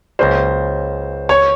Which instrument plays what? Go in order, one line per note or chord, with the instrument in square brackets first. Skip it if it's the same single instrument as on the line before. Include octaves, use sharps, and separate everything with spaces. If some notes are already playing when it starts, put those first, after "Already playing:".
[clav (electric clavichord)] C#2 C#3 F#3 A#3 [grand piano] C5
[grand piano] C#5